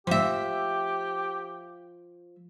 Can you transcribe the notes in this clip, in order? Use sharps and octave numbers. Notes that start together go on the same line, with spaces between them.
F3 G4 E5